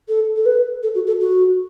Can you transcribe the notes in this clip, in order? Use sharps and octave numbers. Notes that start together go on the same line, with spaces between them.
A4
A4
B4
A4
F#4
A4
F#4